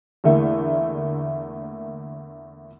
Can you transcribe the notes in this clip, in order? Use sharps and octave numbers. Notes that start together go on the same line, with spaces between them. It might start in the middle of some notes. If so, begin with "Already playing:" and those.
E2 D3 A3 A#3